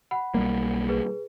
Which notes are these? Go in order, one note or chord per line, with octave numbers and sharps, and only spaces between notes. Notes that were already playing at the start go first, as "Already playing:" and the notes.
F#5 B5
B1 G3 A#3
G#4 B4